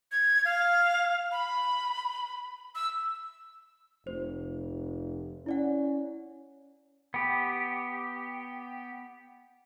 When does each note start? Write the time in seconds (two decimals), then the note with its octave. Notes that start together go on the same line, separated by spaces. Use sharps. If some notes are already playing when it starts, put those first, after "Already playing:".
0.12 G#6
0.45 F5
1.32 B5
2.75 E6
4.07 F1 C5
5.46 C#4 E4 D5 F#5
7.14 B3 G4